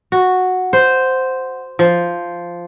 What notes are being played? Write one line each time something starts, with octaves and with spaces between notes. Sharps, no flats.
F#4
C5
F3